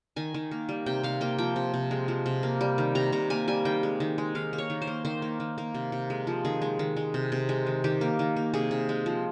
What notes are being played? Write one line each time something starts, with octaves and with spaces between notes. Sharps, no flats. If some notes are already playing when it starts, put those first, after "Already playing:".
D#3 G#5
D#3
A#3
G3
C3 G5
C3 F5
A#3 G5
F3 G5
C3
C3
G#3
F3
C3
A#3
G3
D#3
C3 A#5
C3 A#5
A#3 G#5
G3 G#5
D#3 G5
G#3
D#3
G#3
D#3 F5
A#3
C#5
D#3
C5
A#3
D#3 C5
A#3
D#3
A#3
C3
C3
G#3
F3
D#3 G#4
G#3
D#3
G#3
C3
C3
G#3
D#3
D#3 G4
A#3
D#3
A#3
C3 G#4
C3
G#3
F3